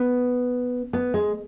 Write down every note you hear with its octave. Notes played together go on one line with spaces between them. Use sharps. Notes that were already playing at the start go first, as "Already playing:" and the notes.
Already playing: B3
B3
G#3